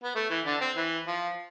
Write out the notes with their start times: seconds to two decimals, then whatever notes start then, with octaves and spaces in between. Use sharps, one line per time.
0.04 B3
0.15 A3
0.30 E3 E4
0.46 D3 D4
0.61 C4
0.76 E3
1.07 F3